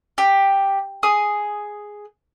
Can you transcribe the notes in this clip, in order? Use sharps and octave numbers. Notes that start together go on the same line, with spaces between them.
G4
G#4 D#6